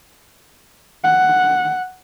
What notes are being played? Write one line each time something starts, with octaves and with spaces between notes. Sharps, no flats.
F#5